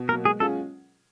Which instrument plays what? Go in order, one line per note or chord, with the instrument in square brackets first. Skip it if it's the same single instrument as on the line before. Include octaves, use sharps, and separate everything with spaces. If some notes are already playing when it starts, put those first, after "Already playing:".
Already playing: [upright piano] B2
[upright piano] F#3 A#3 [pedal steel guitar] A#4
[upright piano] G#3 [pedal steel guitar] G#4
[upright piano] C#4 F4 G#4 [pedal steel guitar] A4